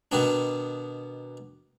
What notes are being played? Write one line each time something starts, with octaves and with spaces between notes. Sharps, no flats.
B2 D#3 B3 D4